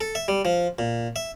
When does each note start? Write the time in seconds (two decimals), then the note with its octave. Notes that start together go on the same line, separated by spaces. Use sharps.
0.01 A4
0.15 E5
0.28 G3
0.45 F3
0.79 A#2
1.16 E5